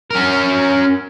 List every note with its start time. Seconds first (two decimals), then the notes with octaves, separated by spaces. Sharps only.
0.11 C#4 A#4